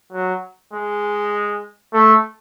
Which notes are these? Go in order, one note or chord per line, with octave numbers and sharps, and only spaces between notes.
F#3
G#3
A3